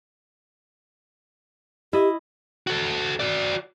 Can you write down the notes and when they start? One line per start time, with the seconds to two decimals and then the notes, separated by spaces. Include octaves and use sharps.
1.93 E4 G4 D#5
2.67 F#4 A4
3.20 F#4 D5